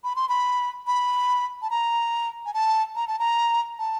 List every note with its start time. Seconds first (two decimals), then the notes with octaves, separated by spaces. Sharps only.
0.04 B5
0.16 C6
0.29 B5
0.87 B5
1.62 A5
1.70 A#5
2.46 G#5
2.54 A5
2.96 A#5
3.08 A5
3.19 A#5
3.79 A5